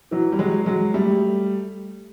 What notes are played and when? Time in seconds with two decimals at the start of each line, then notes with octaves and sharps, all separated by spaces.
0.11 E3 F#3
0.32 G3
0.39 F#3 G#3
0.66 F#3 G#3
0.94 G3 A3